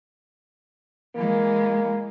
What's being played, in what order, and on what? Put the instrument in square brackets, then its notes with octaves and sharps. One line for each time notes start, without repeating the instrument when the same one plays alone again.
[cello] E3 G#3 [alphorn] A#3